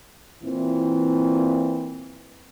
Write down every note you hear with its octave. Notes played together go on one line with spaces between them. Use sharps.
A#2 E3 C4